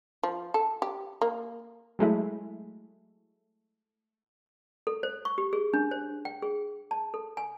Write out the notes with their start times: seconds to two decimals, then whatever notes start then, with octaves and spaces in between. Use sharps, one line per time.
0.23 F3
0.54 A4
0.82 G4
1.22 A#3
1.99 F#3 G#3 A3 E4
4.87 A4
5.03 C5
5.25 C#6
5.38 G4
5.53 G#4
5.74 D4
5.91 C5
6.25 G5
6.42 G#4
6.91 A5
7.14 A4
7.37 G#5